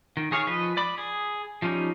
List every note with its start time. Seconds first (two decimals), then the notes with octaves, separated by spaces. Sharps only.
0.17 D#3
0.31 D#3 G#4 C#5 F5 C#6
0.47 F3 B4 D#5
0.77 D5 B5
0.98 G#4
1.62 F3 G3 C#4 D#4